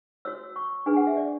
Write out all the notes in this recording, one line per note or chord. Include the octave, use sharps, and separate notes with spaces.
F#4 C#5 E6
C#6
D4 G#4 B4 G#5
F#5
E5
D5